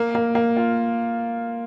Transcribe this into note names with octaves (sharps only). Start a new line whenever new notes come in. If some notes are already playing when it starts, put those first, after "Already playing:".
Already playing: A#3
A#3
A#3
F4